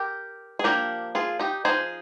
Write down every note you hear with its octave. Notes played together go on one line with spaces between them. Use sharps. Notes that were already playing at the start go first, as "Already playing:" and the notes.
Already playing: G4 A#4
G#4
F3 A#3 D4 G4 A#4
F4 G#4
D#4 G4
F3 A#3 D#4 G#4 C5